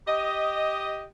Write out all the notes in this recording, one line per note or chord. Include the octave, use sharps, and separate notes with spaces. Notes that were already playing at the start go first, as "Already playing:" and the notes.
G4 D#5